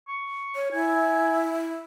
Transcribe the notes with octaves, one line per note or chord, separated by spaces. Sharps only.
C#6
C#5
E4 G#5